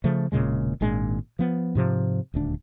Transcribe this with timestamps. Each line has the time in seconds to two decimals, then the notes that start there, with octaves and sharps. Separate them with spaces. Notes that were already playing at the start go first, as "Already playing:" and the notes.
0.04 C#3 F3 A3
0.32 E1 A#2 C#3 G#3
0.81 G#1 A#2 G#3 D4
1.39 F3 B3
1.75 G#2 C3 F3
2.34 D#1 D2 D4